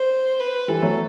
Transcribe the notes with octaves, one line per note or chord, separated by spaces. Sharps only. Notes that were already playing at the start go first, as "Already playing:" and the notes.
Already playing: C5
B4
E3 G3 A4
F#3 A3